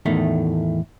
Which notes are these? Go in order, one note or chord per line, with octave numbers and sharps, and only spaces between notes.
E2 A2 D#3 A3